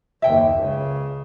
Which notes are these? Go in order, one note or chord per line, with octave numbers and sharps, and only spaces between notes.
F#1 D#2 E5 G5
C#2 C#3